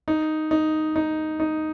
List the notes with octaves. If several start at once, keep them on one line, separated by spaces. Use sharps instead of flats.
D#4
D#4
D#4
D#4